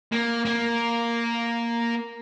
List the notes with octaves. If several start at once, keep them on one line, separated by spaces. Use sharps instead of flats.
A#3
A#3